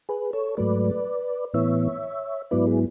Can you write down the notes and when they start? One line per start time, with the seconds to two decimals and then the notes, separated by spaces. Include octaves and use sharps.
0.09 G#4 B4
0.33 A4 C#5
0.57 G#2 F#3 A3 B4 D5
1.54 A2 E3 B3 C#5 E5
2.51 G#2 F#3 B3 E4 B4 D5
2.67 G#4